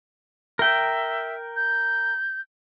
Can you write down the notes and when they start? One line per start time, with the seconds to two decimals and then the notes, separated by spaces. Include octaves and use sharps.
0.59 A#4 E5 G5
1.56 G6